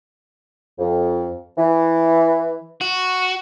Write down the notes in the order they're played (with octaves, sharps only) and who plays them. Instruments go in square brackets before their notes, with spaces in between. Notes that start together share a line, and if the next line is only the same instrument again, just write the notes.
[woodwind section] F2
E3
[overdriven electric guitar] F#4